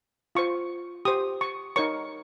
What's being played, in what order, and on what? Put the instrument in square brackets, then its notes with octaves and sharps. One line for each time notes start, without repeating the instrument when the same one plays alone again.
[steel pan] F4 C5 C#6
G4 C5 D#6
C#6
D#4 A#4 C#5 C#6